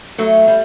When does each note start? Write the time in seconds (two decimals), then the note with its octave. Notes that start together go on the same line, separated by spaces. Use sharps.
0.18 F#3 A3
0.47 G3